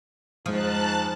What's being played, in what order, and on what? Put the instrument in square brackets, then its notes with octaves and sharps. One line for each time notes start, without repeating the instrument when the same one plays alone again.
[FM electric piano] F2 G#3 D#6 [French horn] G#2 [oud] F3 [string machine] A5 F#6